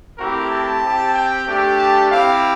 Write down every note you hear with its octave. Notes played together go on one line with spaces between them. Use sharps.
A3 C4 E4 G4 A#4
A5
C4 G4
G5
A3 D4 G4
A5
C4 E4 G4 F5